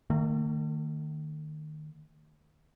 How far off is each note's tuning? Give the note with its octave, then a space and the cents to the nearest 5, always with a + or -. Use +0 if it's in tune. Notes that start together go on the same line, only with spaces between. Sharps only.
D#3 -25 A3 +40